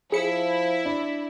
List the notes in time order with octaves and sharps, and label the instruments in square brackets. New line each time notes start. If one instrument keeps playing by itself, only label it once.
[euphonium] F3 [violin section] E4 [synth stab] G#4 C#7
[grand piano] D4